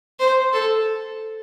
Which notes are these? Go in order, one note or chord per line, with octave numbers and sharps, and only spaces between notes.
C5
A4